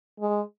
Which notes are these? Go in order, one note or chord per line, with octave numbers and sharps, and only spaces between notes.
G#3